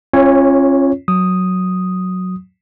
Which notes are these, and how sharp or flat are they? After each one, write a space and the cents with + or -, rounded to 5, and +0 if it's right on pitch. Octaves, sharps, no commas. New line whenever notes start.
C#4 -35 F4 -20 C#5 +0
F#3 -5 D#6 +0